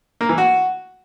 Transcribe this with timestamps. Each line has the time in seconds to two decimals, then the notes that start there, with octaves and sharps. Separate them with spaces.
0.21 A#3
0.29 E3
0.38 F#4